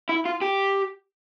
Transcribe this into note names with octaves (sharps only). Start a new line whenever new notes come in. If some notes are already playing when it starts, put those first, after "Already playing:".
E4
F4
G4